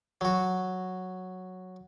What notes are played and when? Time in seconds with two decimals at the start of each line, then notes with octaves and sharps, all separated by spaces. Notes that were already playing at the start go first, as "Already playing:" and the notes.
0.21 F#3 F#4